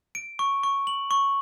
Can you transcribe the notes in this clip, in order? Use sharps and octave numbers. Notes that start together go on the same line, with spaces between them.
D7
C#6
C#6
F#7
C#6